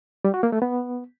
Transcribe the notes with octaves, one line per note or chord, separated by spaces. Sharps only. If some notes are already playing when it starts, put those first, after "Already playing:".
G3
F#4
A#3
A3
B3